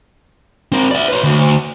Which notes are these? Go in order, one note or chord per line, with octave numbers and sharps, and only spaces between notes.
C4 A#4
D5 E5
B4 C#5
D2